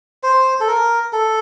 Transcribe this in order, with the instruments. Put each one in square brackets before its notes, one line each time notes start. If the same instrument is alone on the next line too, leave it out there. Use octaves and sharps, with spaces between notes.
[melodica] C5
A4
A#4
A4